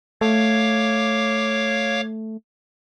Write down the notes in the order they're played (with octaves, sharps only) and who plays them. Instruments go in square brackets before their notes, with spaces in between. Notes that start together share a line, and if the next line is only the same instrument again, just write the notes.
[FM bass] A3 [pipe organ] C#5 F5 D6